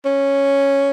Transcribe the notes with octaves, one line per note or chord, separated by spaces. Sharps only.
C#4